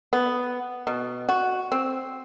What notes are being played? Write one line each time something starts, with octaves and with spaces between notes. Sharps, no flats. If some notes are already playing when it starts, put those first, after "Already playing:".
B3
B2
F#4
C4